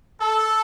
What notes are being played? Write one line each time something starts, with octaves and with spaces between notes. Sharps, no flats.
A4